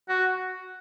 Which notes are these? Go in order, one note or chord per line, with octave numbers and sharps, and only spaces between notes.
F#4